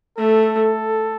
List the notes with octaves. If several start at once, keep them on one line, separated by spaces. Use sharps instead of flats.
A3 A4